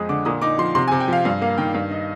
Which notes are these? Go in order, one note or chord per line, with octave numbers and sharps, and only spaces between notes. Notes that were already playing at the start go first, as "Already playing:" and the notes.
Already playing: F2 G#3 D#6
D3 D6
A#2 D#6
D#4 D6
F3 C6
C3 C6
G#5
C3
G5
F3 F5
G2 F5
A#3 F5
D#3 G5
G2 F5
D#4 D#5